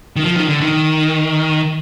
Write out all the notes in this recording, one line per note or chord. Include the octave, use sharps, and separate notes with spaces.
D#3
F3
D#3
D3
D#3